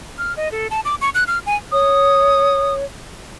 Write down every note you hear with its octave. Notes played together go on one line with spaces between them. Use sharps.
F6
D#5
A4
A5
D6
C#6
F#6
F6
G#5
C#5 D#6